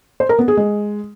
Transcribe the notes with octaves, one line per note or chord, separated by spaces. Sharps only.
C5
A#4
B3
G#4
G#3